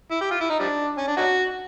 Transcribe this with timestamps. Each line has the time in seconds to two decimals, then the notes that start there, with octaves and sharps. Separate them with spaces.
0.11 E4
0.21 G4
0.31 F4
0.41 E4
0.50 D#4
0.59 F3 G3 D4
0.97 C#4
1.08 D4
1.17 C#4 D#4 F#4